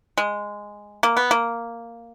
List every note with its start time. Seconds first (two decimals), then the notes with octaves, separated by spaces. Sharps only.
0.18 G#3
1.03 A#3
1.17 B3
1.31 A#3